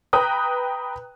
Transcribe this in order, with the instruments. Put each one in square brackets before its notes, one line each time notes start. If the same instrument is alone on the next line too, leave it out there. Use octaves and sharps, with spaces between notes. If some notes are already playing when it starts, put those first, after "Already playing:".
[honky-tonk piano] B4 G5 A#5 D#6 F#6